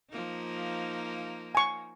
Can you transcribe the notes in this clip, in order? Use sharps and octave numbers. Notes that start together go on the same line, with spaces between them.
F3 A#3 D#4
G#5 C#6